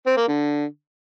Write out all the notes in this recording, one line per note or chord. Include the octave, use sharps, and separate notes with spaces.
C4
A#3
D3